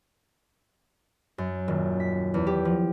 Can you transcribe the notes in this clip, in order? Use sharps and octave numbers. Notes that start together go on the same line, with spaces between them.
F#2
D#1
B6
E2
G4
F3